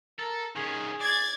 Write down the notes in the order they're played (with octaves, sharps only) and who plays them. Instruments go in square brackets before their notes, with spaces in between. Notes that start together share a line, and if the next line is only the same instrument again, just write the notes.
[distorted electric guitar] A4 [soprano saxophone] A#4
[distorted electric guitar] D#3 C#4 [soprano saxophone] G#4
[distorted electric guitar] D5 [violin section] G#6 A6